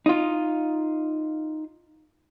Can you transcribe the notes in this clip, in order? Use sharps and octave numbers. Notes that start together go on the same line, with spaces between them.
D#4 F4